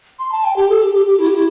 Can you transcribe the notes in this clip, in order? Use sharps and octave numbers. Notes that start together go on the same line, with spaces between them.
C6
A5
G5
G4
A4
G4
G4
G4
E4
G4
E4